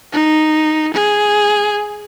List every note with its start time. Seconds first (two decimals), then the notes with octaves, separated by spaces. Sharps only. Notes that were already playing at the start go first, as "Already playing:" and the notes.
0.12 D#4
0.93 G#4